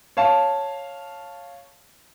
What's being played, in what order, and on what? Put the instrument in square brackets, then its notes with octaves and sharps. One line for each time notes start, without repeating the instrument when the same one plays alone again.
[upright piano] C#5 F5 A5